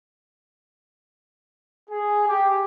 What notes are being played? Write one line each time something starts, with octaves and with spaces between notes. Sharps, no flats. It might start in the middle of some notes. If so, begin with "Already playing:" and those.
G#4
G4